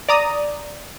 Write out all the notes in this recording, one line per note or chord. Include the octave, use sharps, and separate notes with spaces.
D5 A#5 D#6